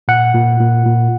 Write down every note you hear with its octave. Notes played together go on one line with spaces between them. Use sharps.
A#2 F#5
A#2
A#2
A#2